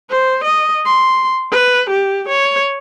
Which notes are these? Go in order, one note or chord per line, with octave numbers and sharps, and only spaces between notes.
C5
D#5
C6
B4
G4
C#5